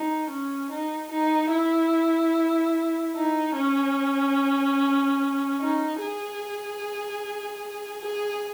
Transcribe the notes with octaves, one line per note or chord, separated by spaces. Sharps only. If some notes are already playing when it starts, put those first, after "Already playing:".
Already playing: D#4
C#4
D#4
D#4
E4
D#4
C#4
D#4
G#4
G#4